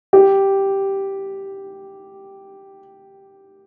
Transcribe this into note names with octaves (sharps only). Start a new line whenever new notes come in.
G4